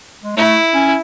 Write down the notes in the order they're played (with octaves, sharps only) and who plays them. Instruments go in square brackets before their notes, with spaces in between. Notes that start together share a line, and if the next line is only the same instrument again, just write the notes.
[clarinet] G#3
[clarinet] A3 [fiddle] E4
[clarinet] C#4